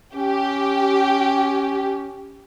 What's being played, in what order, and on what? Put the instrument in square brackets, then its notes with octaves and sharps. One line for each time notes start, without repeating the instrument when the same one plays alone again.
[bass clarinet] C#4 [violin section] G4